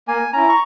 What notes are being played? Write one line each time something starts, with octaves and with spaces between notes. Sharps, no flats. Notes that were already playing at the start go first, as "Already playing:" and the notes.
A#3 G#5
C#4 E4 A#5
C#6